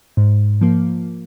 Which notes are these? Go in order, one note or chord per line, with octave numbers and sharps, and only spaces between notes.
G#2
F3 A#3